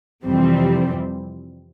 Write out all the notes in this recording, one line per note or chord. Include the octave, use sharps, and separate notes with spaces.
F2 C3 E3 G3 C4